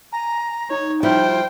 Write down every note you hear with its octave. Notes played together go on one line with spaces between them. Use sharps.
G#5 A#5
D#4 C#5
F3 G3 E4 C5 G5